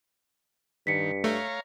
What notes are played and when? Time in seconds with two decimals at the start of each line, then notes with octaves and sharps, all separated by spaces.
0.87 G2 D#3 B6 C#7
1.24 A3 C#5 F5 A#5